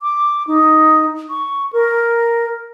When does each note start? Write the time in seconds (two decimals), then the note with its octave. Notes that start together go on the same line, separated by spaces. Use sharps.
0.01 D6
0.47 D#4
1.30 C#6
1.73 A#4